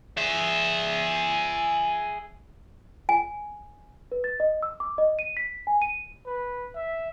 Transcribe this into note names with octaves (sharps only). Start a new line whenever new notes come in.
G#4 E5
G#5
B4
A6
D#5
E6
D6
D#5
D#7
B6
G#5
D#7
B4
E5